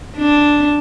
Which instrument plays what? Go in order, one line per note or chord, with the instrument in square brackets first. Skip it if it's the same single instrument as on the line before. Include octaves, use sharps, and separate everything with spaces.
[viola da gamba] D4